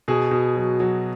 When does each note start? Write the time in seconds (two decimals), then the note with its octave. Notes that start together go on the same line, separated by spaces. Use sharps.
0.08 B2 G#4
0.31 B2
0.56 F#3
0.80 F#3